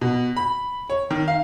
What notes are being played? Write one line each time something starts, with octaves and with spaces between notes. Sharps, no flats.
B2
B5
C#5
D#3
F5